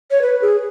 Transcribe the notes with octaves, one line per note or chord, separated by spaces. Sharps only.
C#5
B4
G#4